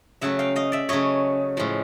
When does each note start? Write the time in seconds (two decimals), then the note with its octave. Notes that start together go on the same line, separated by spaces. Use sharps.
0.21 C#3 F#3 A3 E5 F#5
0.39 F5 G5
0.56 D#5 F5
0.72 D5 E5
0.89 C#3 F#3 A3 C#5 D#5
1.57 A2 F3 G#3